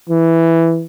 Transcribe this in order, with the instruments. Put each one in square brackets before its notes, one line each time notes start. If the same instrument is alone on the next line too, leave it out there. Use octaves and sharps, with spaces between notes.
[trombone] E3